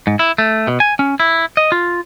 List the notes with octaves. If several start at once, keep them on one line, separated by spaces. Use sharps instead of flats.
G#2
E4
A3
B2
G#5
C#4
E4
D#5
F4